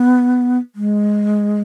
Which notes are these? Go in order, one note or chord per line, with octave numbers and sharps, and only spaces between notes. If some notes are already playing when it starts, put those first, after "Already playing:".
Already playing: B3
G#3